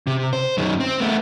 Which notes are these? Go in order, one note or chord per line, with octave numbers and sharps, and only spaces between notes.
C3
C5
F#2 D#3
C4
A3 B3